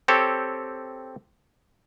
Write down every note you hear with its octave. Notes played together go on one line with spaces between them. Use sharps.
C4 G4 A4 C#5